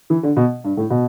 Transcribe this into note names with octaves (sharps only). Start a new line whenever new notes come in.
E3
D3
B2
G2
A2
B2